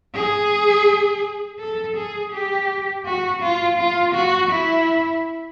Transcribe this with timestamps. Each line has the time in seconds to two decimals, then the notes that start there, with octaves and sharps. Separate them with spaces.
0.14 G#4
1.59 A4
1.96 G#4
2.32 G4
3.06 F#4
3.42 F4
3.78 F4
4.14 F#4
4.51 E4